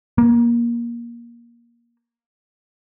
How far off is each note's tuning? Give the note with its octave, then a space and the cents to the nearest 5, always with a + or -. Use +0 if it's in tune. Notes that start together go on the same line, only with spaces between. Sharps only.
A#3 +20